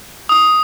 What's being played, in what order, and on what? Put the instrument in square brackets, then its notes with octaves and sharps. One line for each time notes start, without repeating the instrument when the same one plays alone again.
[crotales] D#6